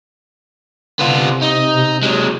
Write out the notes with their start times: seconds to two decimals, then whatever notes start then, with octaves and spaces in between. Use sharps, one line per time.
1.00 C3 B3 F4
1.43 D#4
2.03 F#3 G#3